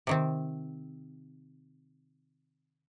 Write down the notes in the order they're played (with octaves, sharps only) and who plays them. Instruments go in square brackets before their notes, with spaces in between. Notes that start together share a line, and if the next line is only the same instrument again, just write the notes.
[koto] C3 D#3 C4